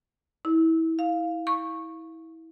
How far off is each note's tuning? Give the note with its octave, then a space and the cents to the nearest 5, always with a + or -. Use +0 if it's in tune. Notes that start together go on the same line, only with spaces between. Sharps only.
E4 -25
F5 +0
C#6 -15